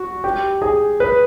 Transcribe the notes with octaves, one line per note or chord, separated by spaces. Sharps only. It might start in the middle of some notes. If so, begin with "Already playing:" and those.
Already playing: F#4
G4
G#4
B4